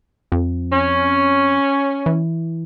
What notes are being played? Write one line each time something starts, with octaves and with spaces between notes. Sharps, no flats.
F2
C#4
E3